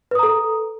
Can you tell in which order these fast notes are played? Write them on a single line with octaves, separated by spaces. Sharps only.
B4 D#6 A#5 A4